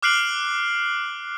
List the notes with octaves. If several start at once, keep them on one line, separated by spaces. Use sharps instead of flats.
D6 F6 F#6 C7 D7 F#7